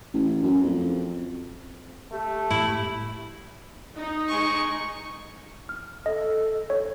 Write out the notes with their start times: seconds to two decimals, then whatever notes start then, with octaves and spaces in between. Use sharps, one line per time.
0.14 A1
0.43 F#2
0.63 F2
2.12 A3 G4
2.50 A2 E4
3.96 D#4
4.28 G#3 C#6
5.69 F6
6.06 A4 D#5
6.70 C#5